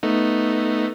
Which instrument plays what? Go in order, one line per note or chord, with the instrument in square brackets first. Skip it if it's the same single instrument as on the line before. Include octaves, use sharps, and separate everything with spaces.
[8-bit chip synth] A3 B3 D#4